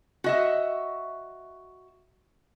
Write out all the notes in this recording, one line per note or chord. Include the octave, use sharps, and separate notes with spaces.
F#4 D#5 E5